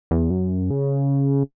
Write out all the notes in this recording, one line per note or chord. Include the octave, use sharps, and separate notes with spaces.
E2
F#2
C#3